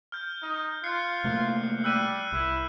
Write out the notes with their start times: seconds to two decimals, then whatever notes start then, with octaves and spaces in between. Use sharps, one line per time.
0.12 F6 G6
0.43 D#4
0.84 F4 F#6 C7 C#7
1.24 C3 A3 A#3
1.84 G3 E6 F#6 D#7
2.32 C2 E4